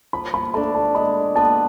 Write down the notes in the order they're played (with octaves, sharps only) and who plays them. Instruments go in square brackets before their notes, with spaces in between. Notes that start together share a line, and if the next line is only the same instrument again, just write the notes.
[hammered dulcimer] F3 [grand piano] B5
[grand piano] B5
[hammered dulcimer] A3 [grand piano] B5
[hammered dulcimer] D4
[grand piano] A5
[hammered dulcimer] G#3 [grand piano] B5
[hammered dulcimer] B3 F4 B4 [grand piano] A5